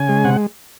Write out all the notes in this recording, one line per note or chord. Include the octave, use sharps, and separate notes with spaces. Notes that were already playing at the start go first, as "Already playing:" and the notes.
Already playing: C#3 G#5
G#3
C3 F#5